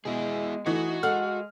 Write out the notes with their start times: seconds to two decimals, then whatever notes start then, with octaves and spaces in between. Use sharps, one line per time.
0.05 B2 G#3 E4 G#4
0.66 E3 A3 D#4 F#4
1.03 G#3 A4 F5 F#5 F6